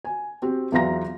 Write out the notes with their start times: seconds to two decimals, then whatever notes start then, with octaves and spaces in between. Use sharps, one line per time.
0.05 G#5
0.42 C4 F#4 G4
0.72 E2 F#3 F4 E5 A#5 A#6